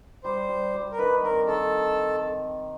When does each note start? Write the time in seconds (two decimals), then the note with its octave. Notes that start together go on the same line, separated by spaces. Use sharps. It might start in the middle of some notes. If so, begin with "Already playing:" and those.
0.24 G3 C5
0.49 G3
0.74 G3
0.92 A#4
0.98 D#3 B4
1.23 C4 A#4
1.47 D#3 A4